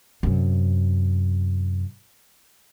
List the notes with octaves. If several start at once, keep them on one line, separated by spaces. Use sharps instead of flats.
F#2 C3